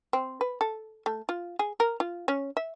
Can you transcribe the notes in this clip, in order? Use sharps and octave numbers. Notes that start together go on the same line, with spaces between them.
C4
B4
A4
A3
F4
G#4
A#4
F4
C#4
E5